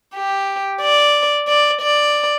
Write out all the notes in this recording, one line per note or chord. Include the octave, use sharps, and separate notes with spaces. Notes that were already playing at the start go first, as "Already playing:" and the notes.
G4
D5
D5
D5